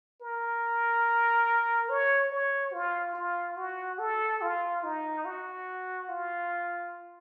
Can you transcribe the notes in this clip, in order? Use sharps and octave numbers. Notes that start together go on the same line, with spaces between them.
A#4
C#5
C#5
F4
F4
F#4
A4
F4
D#4
F#4
F4